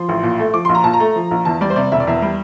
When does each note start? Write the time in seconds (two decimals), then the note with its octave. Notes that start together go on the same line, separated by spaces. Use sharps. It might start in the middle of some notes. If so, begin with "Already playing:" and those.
Already playing: F3 C6
0.09 A1
0.23 A#2
0.39 A3
0.54 F3 D6
0.65 C6
0.69 A#1
0.75 A#5
0.84 A#2 A5
0.93 A#5
1.00 A3
1.16 F3
1.31 A#1
1.45 E2 A5
1.61 G3 D5
1.70 C5
1.76 C3 D5
1.92 E1 E5
2.00 D5
2.07 E2 E5
2.22 G3